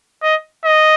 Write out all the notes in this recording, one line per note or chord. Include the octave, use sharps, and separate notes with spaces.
D#5
D#5